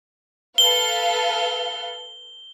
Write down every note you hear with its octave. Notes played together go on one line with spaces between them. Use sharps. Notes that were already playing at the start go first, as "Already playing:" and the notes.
A4 B4 F5 G7